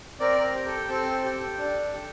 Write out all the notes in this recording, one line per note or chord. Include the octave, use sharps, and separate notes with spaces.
C4 A#4 D5
A#4
G4
A4
C4 A4
G4
D4
G4